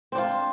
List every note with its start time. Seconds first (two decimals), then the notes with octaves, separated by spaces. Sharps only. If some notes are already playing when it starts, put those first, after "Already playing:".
0.12 C4
0.15 D4
0.18 F4